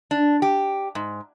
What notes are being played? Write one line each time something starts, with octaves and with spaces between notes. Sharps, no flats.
D4
G4
G#2